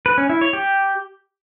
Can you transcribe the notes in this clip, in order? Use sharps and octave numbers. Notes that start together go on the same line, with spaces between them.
B4
C#4
E4
C#5
G4